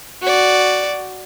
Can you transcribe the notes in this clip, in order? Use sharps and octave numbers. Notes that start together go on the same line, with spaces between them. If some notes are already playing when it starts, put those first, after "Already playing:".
F#4 D5